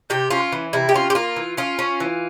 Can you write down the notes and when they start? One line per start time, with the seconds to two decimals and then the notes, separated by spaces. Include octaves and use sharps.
0.10 C3 G4
0.30 C#4 F4
0.52 E3
0.73 C3 E4
0.89 G4
0.94 C#4 F4
1.10 G4
1.15 A#3 F4
1.36 E3
1.57 C#4 F4
1.79 C#4
2.00 E3